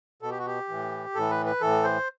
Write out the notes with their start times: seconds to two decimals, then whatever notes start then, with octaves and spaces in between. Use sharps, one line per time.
0.22 B2 A4
0.30 G4
0.38 F#4
0.46 G4
0.69 A2 E3
1.15 A2 E3 A4
1.30 B4
1.46 B4
1.61 A2 E3 A4
1.84 C5